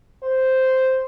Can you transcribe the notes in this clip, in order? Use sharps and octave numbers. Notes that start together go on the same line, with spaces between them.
C5